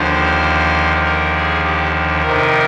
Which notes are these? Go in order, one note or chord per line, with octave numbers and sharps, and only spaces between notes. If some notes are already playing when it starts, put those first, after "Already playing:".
Already playing: D#2 D3 F3 C5
A#4
G#4
G4
F2 C3 D#3 A#4